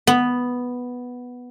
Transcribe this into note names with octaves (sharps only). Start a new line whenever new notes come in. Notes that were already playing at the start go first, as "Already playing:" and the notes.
B3